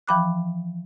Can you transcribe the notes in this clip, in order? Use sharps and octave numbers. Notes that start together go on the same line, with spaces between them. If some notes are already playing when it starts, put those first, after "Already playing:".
E3 F3 G5 B5 D6 F#6